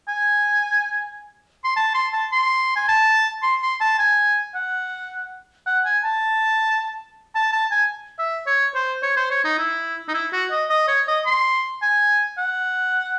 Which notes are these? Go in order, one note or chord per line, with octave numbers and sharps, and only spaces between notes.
G#5
C6
A5
C6
A5
C6
G#5
A5
C6
C6
A5
G#5
F#5
F#5
G#5
A5
A5
A5
G#5
E5
C#5
C5
C#5
C5
C#5
D#4
E4
D#4
E4
F#4
D#5
D#5
C#5
D#5
C6
G#5
F#5